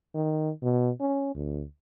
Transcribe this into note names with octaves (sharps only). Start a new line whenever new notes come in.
D#3
B2
C#4
D2